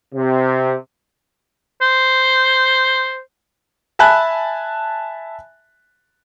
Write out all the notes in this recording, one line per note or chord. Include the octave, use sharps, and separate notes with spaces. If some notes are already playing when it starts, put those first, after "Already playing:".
C3
C5
E5 G#5 A5 B5 F#6